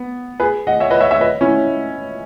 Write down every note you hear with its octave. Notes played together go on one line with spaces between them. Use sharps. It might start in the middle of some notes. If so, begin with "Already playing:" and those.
Already playing: B3
G#4 B4
D#5 F#5
C#5 E5
B4 D#5
C#5 E5
C#5 E5
B4 D#5
C#4 E4